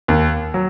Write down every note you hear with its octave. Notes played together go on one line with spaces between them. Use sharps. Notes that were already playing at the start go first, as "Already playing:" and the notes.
D#2
F#3